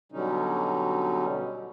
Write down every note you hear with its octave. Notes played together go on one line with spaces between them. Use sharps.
B2 D3 F#3 G3 C#4 D#4